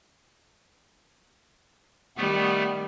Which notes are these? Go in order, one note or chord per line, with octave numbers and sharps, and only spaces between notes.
D#3 G3 A3 B3